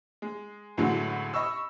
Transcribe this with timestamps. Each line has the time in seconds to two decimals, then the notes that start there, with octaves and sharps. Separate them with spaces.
0.22 G#3
0.77 A1 A2 D3 F#3 G#3
1.34 D#5 B5 C#6 E6